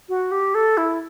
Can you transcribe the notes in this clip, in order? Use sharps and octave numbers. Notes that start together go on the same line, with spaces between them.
F#4
G4
A4
E4